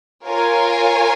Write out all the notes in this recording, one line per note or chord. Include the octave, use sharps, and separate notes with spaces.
F4 A#4 C#5 G#5